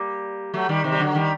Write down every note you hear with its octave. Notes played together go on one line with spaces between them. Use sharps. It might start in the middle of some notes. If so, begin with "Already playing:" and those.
Already playing: G3 A#3
F#3 A3
D#3 G3
C3 D#3
G3
D3 F#3
D#3 G3